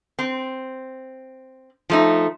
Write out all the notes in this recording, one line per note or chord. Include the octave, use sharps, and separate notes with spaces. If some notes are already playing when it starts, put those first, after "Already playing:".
C4
F3 A3 D#4